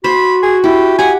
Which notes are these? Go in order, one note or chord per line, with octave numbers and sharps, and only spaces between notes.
F#4 C5 B5
G#4
E4 G4
G4 F#5 G#5